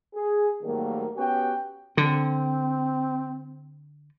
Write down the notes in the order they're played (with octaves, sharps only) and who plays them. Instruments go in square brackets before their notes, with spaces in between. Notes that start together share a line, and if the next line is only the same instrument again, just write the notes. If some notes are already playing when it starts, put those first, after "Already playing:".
[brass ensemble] G#4
G#2 D#3 F#3 G3 A3 A#3
B3 C#4 F#4 G4 F#5 G5
[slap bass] D3 [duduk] C4